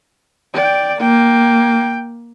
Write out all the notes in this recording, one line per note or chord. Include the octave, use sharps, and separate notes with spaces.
D5 G5
A#3 G5